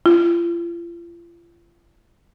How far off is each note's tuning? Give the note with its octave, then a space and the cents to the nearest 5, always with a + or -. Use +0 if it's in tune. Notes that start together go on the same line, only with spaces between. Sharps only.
F4 -40